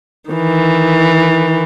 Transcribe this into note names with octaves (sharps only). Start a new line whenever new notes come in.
D#3 E3